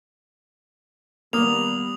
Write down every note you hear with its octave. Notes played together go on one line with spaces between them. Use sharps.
D#3 G3 A#3 B3 D#6 F7